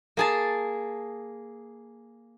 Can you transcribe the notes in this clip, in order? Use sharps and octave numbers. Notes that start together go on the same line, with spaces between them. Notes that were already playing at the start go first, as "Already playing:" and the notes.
A#3 G#4 A5